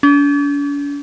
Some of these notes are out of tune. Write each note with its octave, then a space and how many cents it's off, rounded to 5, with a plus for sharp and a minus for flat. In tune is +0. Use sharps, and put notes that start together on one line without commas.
D4 -45